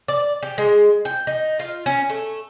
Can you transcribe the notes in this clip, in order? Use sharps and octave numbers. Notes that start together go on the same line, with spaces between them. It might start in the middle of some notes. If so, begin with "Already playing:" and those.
D5
G4
G#3
G5
D#4
F4
C#4
A3